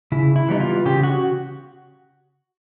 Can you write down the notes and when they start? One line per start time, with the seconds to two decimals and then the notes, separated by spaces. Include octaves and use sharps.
0.12 C#3 E4
0.36 E4
0.48 E3 G3 B3 D#4
0.60 F4
0.85 C#3 G4
1.03 F#4